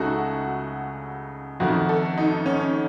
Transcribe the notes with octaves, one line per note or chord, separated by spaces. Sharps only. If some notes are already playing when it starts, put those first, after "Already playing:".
Already playing: C#2 C#3 A3 D#4 F#4 A4
F2 D#3 A3 F#4
A4
D#4
C#4